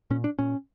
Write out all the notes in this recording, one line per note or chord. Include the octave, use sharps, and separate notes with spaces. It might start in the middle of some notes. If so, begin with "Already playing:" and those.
A#2 C#4
D4
A#2 C#4